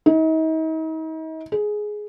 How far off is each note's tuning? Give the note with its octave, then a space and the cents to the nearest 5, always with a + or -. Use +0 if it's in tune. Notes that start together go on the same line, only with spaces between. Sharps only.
D#4 +40
G#4 +10